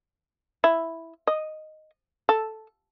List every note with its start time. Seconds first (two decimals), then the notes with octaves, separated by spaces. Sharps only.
0.64 E4
1.27 D#5
2.29 A4